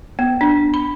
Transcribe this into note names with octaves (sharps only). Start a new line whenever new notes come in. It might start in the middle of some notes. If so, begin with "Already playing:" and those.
B3
D4
B5